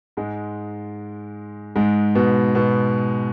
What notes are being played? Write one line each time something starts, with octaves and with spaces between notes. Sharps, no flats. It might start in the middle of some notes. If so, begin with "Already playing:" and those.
G#2 G#3
G#2 G#3
B2 B3
B2 B3